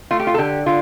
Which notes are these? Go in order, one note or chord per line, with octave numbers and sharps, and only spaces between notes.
A3 F4
G4
F4
A4
D3 G4
D3 F4